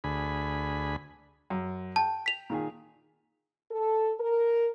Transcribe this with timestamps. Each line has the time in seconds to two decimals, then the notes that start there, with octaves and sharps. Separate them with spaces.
0.04 D2 G#4 B5
1.50 F#2
1.96 G5 A5
2.26 B6 F7
2.50 A#2 D#3 G#4
3.71 A4
4.20 A#4